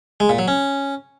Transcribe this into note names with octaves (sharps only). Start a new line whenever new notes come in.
G#3
A#2
F#3
C#4